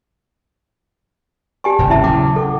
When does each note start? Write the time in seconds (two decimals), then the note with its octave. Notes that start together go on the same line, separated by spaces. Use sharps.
1.64 G4 D5 G#5 A5 C#6
1.79 D#1 G#1 C#3 G5
1.90 C#4 E4 E5 A5
2.04 C#3 F#3 D6
2.36 A4 F#5 G5 D6